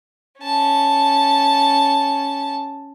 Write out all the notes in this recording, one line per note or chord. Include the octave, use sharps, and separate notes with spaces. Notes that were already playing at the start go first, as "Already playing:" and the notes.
C#4 A5